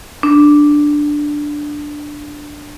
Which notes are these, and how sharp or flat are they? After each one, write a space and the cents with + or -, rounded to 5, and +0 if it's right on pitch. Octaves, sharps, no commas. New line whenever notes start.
D4 +5